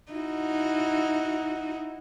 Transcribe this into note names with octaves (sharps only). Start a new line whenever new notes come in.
D#4 E4 F#4